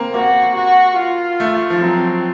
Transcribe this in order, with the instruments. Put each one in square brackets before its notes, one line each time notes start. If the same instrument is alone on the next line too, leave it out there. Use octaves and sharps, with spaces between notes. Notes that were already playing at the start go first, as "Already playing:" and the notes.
Already playing: [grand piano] A#3 C4
[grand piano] A#3 [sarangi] F#4
[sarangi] F#4
F4
[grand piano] A3
F3
[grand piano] F#3 [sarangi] C4